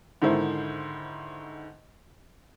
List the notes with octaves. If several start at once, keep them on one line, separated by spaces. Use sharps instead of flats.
G#2 D3 D#3 E4 C5